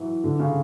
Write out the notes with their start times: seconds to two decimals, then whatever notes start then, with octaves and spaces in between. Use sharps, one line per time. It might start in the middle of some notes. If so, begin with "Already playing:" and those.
Already playing: E3 F#3
0.24 D3
0.39 C#3